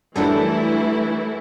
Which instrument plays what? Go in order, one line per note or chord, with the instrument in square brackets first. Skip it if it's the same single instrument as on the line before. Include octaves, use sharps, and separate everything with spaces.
[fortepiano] F#2 G3 [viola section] E3 A3 E4 [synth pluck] D4 A4